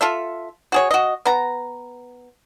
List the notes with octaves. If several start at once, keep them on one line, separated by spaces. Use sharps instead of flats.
F4 A4 E5
F#4 G#4 C#5
F#4 D#5
B3 A#5